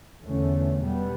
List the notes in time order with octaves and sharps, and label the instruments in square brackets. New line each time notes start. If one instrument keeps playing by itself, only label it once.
[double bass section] E2 D3 A3 C#4
B2 G3 B3